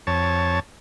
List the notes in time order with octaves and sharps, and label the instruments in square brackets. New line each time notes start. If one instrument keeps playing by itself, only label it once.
[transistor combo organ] F2 C#5 A5